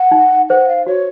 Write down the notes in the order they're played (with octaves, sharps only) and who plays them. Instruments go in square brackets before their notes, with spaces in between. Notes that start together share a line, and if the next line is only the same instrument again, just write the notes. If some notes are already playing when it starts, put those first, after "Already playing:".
Already playing: [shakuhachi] F#5
[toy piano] D#4
[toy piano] C5 [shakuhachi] F#5
[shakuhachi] F5
[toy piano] F#4 [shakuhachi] C#5